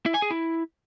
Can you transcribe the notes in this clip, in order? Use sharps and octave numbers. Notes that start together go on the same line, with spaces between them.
E4
G#5
G#4
E4